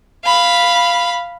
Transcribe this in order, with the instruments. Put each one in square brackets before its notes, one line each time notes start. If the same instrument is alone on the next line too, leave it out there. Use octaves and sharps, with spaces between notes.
[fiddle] F5 B5